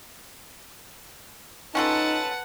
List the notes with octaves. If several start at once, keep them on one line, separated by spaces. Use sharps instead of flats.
C#4 D#4 F4 A4 B4 F#5 A5